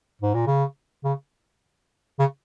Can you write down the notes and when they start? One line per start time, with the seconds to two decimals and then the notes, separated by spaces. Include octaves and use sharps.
0.22 G#2
0.35 A#2
0.47 C#3
1.04 C#3
2.19 C#3